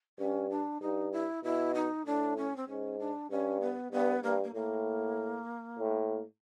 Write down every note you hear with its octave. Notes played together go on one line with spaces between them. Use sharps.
G2 C#4
D4
G2 D#4
E4
B2 E4
D#4
A2 D4
C#4
C4
G#2 C#4
D4
G2 C#4
B3
G2 B3
G2 A#3
A#3
A2 A#3
A2